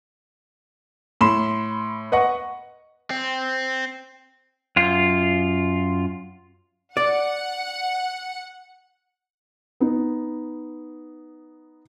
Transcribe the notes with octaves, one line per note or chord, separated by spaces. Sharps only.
A2 B5 C6 E7
B4 D#5 F#5 C#6
C4
F#2 F4
D5 F#5
B3 D#4